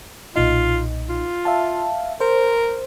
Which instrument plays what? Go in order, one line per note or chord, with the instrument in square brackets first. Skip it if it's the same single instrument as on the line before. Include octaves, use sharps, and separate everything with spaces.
[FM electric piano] B1 A#2 D#4 [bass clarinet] F4
[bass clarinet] F4
[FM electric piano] E5 F5 A5
[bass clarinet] A#4 [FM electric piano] C5